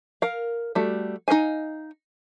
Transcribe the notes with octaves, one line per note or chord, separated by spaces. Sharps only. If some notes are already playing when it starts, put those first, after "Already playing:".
A#4 F5
G3 A3 F#4
D#4 B4 D#5 F5 G#5